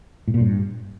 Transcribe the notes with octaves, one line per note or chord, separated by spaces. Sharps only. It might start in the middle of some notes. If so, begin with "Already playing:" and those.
A2
A#2
G2